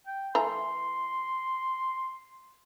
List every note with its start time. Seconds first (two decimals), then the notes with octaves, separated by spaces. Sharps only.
0.07 G5
0.35 E3 A3 A#5 C6